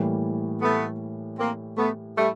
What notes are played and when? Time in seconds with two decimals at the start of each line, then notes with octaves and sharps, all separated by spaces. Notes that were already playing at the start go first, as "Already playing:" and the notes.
Already playing: A2 E3 G3 A#3
0.62 A3 B3
1.39 A#3 C4
1.78 A3 B3
2.17 G3 A3